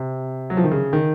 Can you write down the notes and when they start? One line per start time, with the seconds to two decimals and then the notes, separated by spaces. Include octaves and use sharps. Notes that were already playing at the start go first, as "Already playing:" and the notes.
Already playing: C3
0.50 F#3
0.57 F3
0.64 D#3
0.71 C#3
0.93 D#3